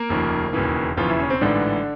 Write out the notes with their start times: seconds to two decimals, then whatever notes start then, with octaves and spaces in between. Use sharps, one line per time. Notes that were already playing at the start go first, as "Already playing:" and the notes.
Already playing: A#3 A#4
0.09 F1 D#2 C#3 F3
0.53 E1 D#2 C#3 E3
0.97 E1 D#2 C#3 E3 F3 F4
1.08 E3 E4
1.19 C#4
1.30 C4
1.41 A1 G#2 D3 E3 D4